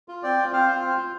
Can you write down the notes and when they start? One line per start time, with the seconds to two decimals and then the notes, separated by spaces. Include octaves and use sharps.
0.08 F4
0.23 C4 D5 G5
0.37 F4
0.52 C4 C5 F5
0.68 F4
0.82 C4
0.97 F4